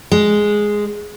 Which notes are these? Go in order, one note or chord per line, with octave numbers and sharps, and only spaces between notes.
G#3